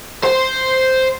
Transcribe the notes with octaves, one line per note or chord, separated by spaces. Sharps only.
C5